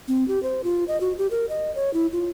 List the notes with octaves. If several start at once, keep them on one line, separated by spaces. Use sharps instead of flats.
C4
G4
C5
F4
D#5
F#4
G4
A#4
D#5
C#5
E4
F4